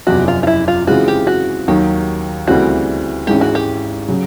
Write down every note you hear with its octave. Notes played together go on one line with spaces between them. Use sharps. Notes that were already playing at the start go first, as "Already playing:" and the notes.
F#1 E2 C3 F3 F#4
F4
F4
E4
F4
C#3 E3 G#3 C4 F4 F#4
G4
F#4
D#2 D#3 F#3 G4
D2 C#3 E3 G3 C4 F#4
G#1 G#2 E3 G#3 C#4 G4
F#4
G4
C#3 F#3